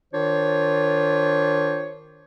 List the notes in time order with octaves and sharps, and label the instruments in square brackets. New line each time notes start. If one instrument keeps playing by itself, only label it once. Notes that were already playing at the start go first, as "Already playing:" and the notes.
[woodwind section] D#3 D4 F4 C5 C#5